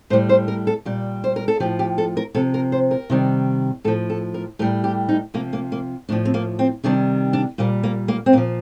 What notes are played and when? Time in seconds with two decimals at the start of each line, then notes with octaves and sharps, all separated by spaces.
0.10 A2 C5
0.13 G3
0.29 C5
0.48 A#4
0.67 A4
0.85 A#2 G3
1.24 C5
1.36 A#4
1.48 A4
1.60 A2 F3 G4
1.79 G4
1.98 A4
2.17 A#4
2.35 C3 F3 A4
2.54 A#4
2.72 C5
2.91 A#4
3.10 C3 D#3 G3
3.84 A2 A4
3.88 F3
4.10 A4
4.34 A#4
4.59 A2 G3 A#4
4.84 G4
5.09 D#4
5.34 C3 F3 A#3
5.53 A#3
5.72 A#3
6.09 A2 F3 D4
6.25 C4
6.34 A#3
6.59 C4
6.84 C3 D#3 G3 D4
7.33 D4
7.58 A#2 G3 A#3
7.83 A#3
8.08 A#3
8.26 C4
8.33 A#2 F3 A#3